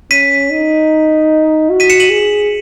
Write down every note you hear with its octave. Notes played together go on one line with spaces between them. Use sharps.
C#4 B6 D#7
D#4
F#4
B6 D#7
C#7 E7
D#7 F#7
G#4